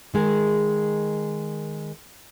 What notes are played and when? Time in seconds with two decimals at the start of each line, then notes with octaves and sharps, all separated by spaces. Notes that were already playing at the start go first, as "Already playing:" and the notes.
0.14 D#3 G#3 G#4 A#4